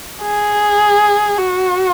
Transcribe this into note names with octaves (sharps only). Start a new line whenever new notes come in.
G#4
F#4